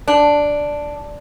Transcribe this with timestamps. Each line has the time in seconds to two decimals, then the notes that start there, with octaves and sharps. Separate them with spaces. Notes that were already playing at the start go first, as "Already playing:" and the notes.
0.08 D4